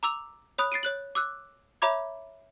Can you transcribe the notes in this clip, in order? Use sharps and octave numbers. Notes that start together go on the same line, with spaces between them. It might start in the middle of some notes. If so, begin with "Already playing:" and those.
A#5 D6 E6 F7
C#5 B5 D#6 F#6
A6 C7 D7 D#7
C#5 F#6 F#7
D6 E6 F#6
C#5 E5 A#5 B5 D6 G#6